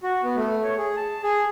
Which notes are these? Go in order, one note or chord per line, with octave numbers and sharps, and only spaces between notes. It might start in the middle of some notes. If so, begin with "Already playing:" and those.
F#4
B3
A3
C#5
G#4
A5
G#4